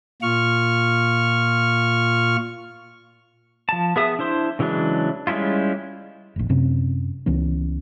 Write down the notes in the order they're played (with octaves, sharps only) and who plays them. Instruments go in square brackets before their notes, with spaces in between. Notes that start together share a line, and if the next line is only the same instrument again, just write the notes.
[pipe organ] A#2 F4 C#6 F6
[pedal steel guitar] F3 A5
B3 G#4 E5 D#6
D4 E4 C5 C6
C#3 E3 F#3 G#3 D4
G3 G#3 C#4 E4 F4
[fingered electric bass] F1 A#1
F#2 C3 C4 C#4
C#2 E3 B3 C#4